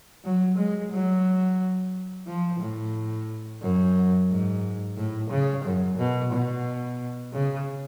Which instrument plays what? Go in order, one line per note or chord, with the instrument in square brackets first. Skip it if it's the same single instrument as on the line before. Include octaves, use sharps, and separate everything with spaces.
[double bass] F#3
G#3
F#3
F3
A2
F#2
G#2
A2
C#3
F#2
B2
B2
C#3